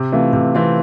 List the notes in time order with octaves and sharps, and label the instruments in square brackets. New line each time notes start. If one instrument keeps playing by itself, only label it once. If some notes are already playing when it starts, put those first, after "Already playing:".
Already playing: [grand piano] C3
E3 A3 C4 F4
C3
E3 A3 C4 F4